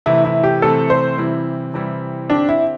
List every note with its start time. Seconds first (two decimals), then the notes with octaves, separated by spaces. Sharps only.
0.06 C3 E3 A3 C4 E4
0.25 E4
0.44 G4
0.62 C3 E3 A3 C4 A4
0.90 C5
1.18 C3 E3 G3 C4 E4
1.74 C3 E3 G3 C4 E4
2.30 D3 C4 D4 G4
2.49 E4